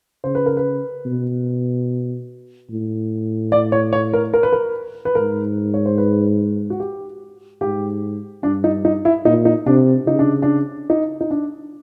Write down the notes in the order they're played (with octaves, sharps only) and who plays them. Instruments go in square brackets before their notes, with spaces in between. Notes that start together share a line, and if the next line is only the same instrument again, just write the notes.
[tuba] C#3 [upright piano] C5
[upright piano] B4
A#4
B4
[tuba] B2
A2
[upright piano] D5
C#5
C#5
A#4
A#4
B4
A#4
B4
[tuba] G#2 [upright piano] A#4
[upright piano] C#5
C5
B4
F#4
G4
[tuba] G#2 [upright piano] G4
[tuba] G2 [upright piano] D4
[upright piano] D#4
D#4
E4
[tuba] A#2 [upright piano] D#4
[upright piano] D#4
[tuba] C3 [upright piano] D4
[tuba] C#3 [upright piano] D#4
[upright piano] D4
D4
D#4
D#4
D4